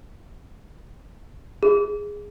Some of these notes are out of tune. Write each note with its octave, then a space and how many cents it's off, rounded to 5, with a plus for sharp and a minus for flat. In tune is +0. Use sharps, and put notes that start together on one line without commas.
G#4 -10